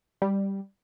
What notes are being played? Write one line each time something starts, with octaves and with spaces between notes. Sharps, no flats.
G3